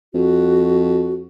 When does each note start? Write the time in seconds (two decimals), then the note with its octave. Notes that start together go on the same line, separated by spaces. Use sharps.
0.14 F2 F#4